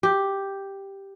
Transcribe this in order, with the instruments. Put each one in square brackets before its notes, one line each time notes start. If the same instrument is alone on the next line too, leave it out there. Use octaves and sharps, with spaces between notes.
[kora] G4